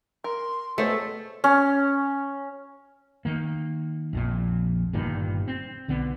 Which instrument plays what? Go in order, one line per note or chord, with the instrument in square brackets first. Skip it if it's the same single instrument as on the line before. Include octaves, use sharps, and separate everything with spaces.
[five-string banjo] A#4 [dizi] C6
[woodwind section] F2 B2 A4 [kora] A3 [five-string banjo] G#4 C5 C#5
[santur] C#4
[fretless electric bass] D#3 A#3
A#1 F2 A#2
G1 G2 A#2 D#3
C4
B1 D3 B3